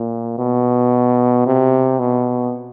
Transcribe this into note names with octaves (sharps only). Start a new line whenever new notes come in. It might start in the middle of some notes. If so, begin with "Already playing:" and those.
Already playing: A#2
B2
C3
B2